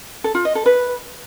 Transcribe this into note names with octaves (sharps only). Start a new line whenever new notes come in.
A4
F4
D#5
A4
B4